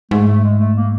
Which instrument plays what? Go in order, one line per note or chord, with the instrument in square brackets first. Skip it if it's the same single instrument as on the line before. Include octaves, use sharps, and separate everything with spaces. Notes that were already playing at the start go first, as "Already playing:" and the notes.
[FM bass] G#2 [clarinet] A3
[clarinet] A3
G#3
A3
A#3